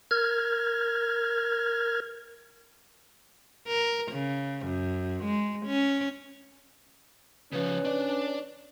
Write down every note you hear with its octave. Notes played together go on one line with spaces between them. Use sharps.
A#4 F6 G#6
A#4
C#3
F#2
G#3
C#4
C#3 F3 C#4 B4
D4 D5